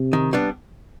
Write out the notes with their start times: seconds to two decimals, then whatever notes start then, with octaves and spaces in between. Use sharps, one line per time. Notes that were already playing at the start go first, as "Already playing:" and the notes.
Already playing: C3
0.13 D#3
0.33 G3 B3 D4